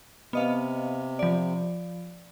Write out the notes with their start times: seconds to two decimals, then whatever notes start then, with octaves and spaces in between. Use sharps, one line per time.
0.33 C3 B3 D#5 F5
1.19 F3 D5